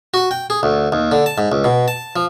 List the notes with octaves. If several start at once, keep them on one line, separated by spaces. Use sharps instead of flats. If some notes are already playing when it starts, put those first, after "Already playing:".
F#4
G5
G#4
D2
D#2
D3
A5
G#2
C#2
B2
A5
F3